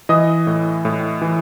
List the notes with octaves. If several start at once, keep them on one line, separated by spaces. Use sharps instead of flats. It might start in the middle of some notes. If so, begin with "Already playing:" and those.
E3 D#5 D#6
A2
A2
E3